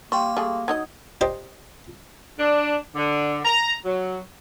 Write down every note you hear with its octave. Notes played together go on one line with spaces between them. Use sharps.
G3 A#3 G5 C6 C#6
G3 A3 G#4
F#3 D#4 D#5 G#6
D4 G4 C5 D#5
D4
D3
A#5
F#3